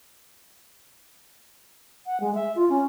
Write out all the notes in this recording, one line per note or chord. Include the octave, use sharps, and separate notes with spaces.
F#5
G#3
E5
F4
C#4